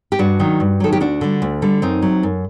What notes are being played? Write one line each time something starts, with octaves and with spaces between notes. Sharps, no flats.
G4
G2 D4 F#4
D#3 F#3
G2
D#3 F#3 A4
G4
D2 D4 F#4
D3 G3
D2
D3 G3
F#2 C4 D#4
F#3
F#2